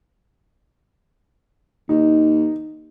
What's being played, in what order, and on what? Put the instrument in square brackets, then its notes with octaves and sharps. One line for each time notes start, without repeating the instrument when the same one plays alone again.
[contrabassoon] D#2 [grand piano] D#4